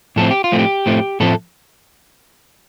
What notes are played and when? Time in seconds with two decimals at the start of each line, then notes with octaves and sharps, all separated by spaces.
0.16 A2 F3 A3 C4 A4
0.31 G4
0.44 F4
0.52 A2 F3 A3 C4
0.59 G4
0.86 A2 F3 A3 C4
1.20 A2 F3 A3 C4 A4